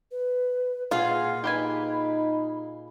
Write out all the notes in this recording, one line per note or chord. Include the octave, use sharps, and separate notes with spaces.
B4
A#2 F4 G#4 F5 F#5
D#4 G4 B4 G#5 B5